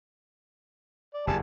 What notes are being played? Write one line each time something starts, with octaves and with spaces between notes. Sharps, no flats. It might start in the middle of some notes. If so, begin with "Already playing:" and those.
D5
F#1 E2 G3 G#5 A5